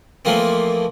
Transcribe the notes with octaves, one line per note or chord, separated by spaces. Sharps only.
E3 F3 A3 A#3 C4